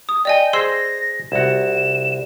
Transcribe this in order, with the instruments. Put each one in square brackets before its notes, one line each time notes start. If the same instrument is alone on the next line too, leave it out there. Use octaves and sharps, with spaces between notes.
[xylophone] D#6
[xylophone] D5 D#5 G#5 [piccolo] G5
[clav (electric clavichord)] G#4 C5 [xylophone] C6 E6 [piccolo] A#6
[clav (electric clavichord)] C2 F#4 [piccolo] E7